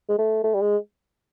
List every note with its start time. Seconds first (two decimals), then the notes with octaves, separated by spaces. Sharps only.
0.09 G#3
0.18 A3
0.44 A3
0.55 G3
0.62 G#3